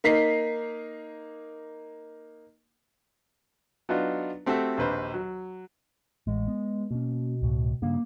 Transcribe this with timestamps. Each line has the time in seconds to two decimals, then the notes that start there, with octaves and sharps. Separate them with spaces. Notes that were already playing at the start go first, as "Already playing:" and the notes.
0.04 A#3 D#4 B6 C7
3.89 F#3 B3 D4 D#4 F4
4.46 A3 C4 F#4 G4 A4 E5
4.77 A#1 D#2 B4 C5
5.14 F#3
6.27 A1 G#3
6.48 B3
6.91 B2 A#3 C#4
7.42 C#2 A2
7.82 G2 C#3 A#3